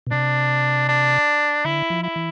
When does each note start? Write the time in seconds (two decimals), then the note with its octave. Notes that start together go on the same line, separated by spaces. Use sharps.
0.07 B2
0.11 C3 D4
0.89 D4
1.65 D3 E4
1.90 F3
2.03 E4
2.16 E3